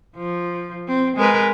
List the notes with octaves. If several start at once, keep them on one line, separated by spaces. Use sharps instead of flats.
F3
C4
G#3 A#4 B4